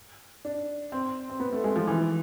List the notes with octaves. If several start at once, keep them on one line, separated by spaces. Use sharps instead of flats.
D4
C4
C4
B3
A3
G#3
F3
E3